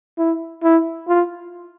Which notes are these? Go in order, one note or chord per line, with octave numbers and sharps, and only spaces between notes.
E4
E4
F4